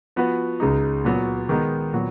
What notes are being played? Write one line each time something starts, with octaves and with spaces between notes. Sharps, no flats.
F3 B3 F#4 B4
C#2 C#3 G#3 D#4
A#2 F#3 B3 F#4
D#3 G#3 B3 D#4
A#2 F#3 B3 F#4